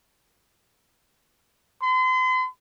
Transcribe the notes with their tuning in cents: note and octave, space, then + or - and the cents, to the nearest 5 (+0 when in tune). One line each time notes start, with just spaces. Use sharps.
C6 -40